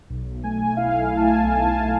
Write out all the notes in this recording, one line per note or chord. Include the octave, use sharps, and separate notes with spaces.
B1
A3 G#5
E4 F5
F5
A3
A5
G#5
B1 A5
G#5
A5